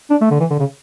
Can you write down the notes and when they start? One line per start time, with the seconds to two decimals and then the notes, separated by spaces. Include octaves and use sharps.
0.10 D4
0.21 A3
0.31 D3
0.40 E3
0.50 D3
0.59 C#3